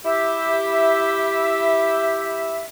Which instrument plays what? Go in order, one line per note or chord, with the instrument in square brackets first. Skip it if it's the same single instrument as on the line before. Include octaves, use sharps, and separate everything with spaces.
[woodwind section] E4 G4 E5